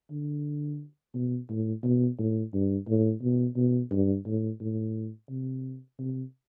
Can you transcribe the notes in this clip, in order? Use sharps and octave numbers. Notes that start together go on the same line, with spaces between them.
D3
B2
A2
B2
A2
G2
A2
B2
B2
G2
A2
A2
C3
C3